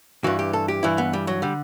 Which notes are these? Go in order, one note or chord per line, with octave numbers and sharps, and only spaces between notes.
G2 E3 F#4
G4
A4
G4
G2 E3 E4
B3
G3
F#3
D3 G3